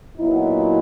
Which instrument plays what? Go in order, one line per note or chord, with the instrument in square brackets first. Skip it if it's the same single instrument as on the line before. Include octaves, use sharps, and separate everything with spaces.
[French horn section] A#2 F#3 B3 D#4 E4